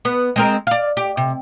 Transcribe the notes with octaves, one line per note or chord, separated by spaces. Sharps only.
B3
G#3 C4 A#4
D5 F5
G4
C3